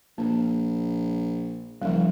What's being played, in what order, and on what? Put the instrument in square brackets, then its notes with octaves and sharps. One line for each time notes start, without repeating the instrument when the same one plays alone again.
[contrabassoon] A#1 [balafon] A#3
[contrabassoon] F#1 [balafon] F3 G3